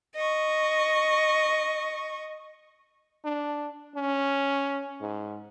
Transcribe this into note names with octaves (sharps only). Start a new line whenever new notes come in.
D#5 C#6
D4
C#4
G#2